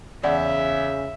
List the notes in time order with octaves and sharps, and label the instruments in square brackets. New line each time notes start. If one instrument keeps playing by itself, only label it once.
[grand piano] E2 [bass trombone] C#3 [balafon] D5 F#5 [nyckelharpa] E5